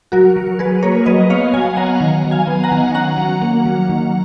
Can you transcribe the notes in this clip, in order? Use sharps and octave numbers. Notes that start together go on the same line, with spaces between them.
F#3 F#4 A#4
F#3
F#3 G#4 B4
A#3 A#4 C#5
F#3 B4 D#5
B3 C#5 F5
F#3 F5 G#5
B3 F#5 A#5
D#3
F#3
F5 G#5
B3
F#5 A#5
D#3
C#4 F#5 A#5
F#3
A#3
F#3
D#3